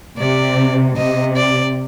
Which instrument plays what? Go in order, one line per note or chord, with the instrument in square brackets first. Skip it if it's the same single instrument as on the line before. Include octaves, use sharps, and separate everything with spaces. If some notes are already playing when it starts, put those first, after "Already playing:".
[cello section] C3 [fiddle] D5
[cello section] C3 [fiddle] D#5
[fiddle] D5